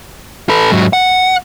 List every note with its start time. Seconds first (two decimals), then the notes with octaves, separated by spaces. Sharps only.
0.49 A4 B4
0.71 G#2 F#3
0.93 F#5